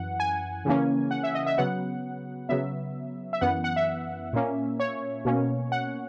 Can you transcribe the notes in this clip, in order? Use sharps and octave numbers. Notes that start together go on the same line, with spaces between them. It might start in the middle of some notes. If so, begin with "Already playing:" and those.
Already playing: F#2 E3 F#5
G#5
C#3 E3 A#3 C#4
F#5
E5
D#5
E5
C#3 F#3 B3 F#5
C#3 F#3 B3 E5
E5
F#2 E3 B3 F#5
F#5
E5
A#2 A#3 C#4
C#5
B2 A#3 C#4
F#5